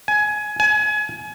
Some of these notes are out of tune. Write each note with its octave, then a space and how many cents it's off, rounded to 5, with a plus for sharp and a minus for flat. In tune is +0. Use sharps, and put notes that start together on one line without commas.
G#5 +20
G#5 +30